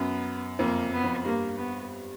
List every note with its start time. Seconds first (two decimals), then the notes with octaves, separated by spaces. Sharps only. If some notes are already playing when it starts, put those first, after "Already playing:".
Already playing: F#2 B3
0.59 F2 A#3
0.92 B3
1.03 F2
1.25 G2 A#3
1.58 B3